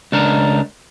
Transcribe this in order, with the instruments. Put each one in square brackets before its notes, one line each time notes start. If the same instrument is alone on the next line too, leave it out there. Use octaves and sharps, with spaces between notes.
[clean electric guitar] C#2 D4 A#4